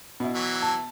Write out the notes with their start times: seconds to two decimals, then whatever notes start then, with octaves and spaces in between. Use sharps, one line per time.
0.20 B2 E4
0.35 E3 F#3 E5
0.62 A5